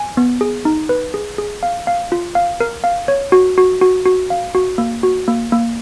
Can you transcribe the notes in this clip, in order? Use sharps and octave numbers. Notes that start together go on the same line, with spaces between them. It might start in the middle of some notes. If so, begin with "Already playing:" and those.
Already playing: G#5
B3
G#4
D#4
B4
G#4
G#4
F5
F5
F4
F5
A#4
F5
C#5
F#4
F#4
F#4
F#4
F5
F#4
A#3
F#4
A#3
A#3